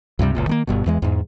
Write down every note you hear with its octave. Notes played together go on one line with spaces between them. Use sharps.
C#2 G2 C3 G3
F#1 C#2 A#2
D#3 A3 A#3
G1 G2 B2
E2 E3 G#3
E2 G#2